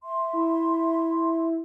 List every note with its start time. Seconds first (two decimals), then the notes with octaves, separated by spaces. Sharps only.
0.04 E5 C6
0.33 E4